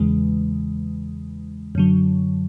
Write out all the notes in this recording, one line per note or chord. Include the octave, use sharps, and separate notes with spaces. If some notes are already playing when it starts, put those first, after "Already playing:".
Already playing: E2 C#3 E3 G#3
F#2 D3 F#3